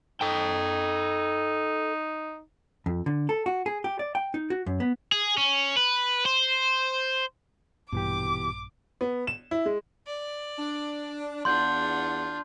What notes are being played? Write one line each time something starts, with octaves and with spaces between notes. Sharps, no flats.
D#4 A4 G5
F2
D3
A4
F#4
G#4
G4
D5
G5
D#4
F#4
F#2
B3
G#4
C#4
B4
C5
A#1 G2 B2 E3 G4 D6
B3
E7
E4
G#3
D5
D4
E2 D4 F4 F#5 C6 G6